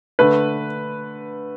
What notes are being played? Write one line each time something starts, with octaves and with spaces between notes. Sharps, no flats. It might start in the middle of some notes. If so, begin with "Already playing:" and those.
D3 A3 B4